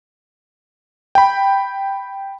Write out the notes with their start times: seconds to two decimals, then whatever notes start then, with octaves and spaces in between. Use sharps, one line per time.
1.15 G5 B5